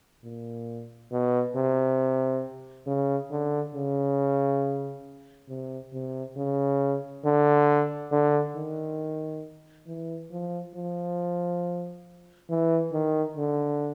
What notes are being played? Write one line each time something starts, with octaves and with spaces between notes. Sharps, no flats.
A#2
B2
C3
C#3
D3
C#3
C3
C3
C#3
D3
D3
D#3
E3
F3
F3
E3
D#3
D3